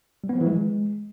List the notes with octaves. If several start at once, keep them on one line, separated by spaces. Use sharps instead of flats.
G3
B3
F3
E3
G#3